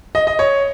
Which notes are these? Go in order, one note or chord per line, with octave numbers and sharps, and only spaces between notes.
D#5
D#5
C#5